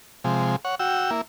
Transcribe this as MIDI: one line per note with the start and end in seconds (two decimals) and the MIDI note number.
0.24 0.56 48
0.24 0.56 53
0.24 0.56 56
0.65 0.75 73
0.65 0.75 78
0.80 1.11 66
0.80 1.11 79
0.80 1.11 88
1.11 1.21 58
1.11 1.21 64